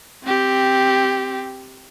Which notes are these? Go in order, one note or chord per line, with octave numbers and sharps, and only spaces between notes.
C4 G4